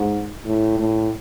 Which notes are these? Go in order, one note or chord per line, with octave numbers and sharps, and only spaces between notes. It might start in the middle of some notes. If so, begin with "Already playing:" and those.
Already playing: G#2
A2
A2